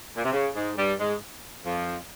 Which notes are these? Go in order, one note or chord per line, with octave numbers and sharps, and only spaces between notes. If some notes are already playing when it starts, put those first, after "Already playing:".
A#2
C3
C#3
G#2 G#3
G2 G3
G#2 G#3
F2 F3